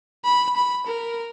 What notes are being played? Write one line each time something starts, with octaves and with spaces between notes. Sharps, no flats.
B5
B5
A#4